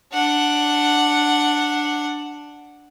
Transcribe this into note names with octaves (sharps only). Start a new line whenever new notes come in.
D4 F#5